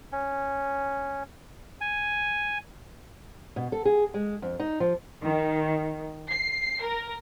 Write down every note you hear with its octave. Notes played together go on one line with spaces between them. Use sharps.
C#4
G#5
B2
A4
G#4
G#3
F2
D#4
F3
D#3
C7
A#4